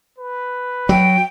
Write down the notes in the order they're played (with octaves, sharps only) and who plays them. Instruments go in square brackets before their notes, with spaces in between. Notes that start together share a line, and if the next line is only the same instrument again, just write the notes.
[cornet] B4
[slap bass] F#3 [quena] G5